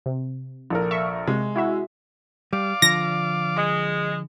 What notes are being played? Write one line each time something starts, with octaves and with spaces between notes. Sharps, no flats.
C3
A#1 A4 A#4
E5 C#6
C3 G#3
E4 F#4 E5
G3 D5 F5 D6
D3 F3 A#6
G#3